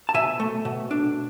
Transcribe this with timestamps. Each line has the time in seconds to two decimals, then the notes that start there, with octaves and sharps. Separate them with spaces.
0.09 A5
0.14 B2 E5 G#5
0.40 A3
0.65 B2
0.91 D4